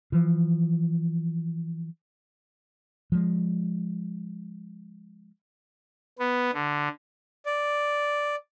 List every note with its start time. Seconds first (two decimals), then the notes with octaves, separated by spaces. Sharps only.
0.12 E3 F3
3.12 F3 G#3
6.19 B3
6.53 D3
7.46 D5